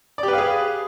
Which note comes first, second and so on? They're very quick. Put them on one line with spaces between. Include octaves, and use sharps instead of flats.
D5 G4 B4 F5 G#4